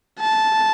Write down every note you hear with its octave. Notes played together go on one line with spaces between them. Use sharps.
A5